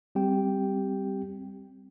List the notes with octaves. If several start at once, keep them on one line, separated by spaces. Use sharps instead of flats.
G3 C4 G4 G5